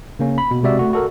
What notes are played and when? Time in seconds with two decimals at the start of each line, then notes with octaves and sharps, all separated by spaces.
0.19 C#3 A#3 C#4
0.38 B5
0.51 B2
0.63 C3 G#3 F#4 D5 E5
0.79 A3 F#4
0.93 F#4 A4 A#4